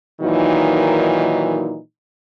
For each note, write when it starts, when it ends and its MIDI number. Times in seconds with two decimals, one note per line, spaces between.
0.21 1.78 46
0.21 1.78 51
0.21 1.78 52
0.21 1.78 54
0.21 1.78 63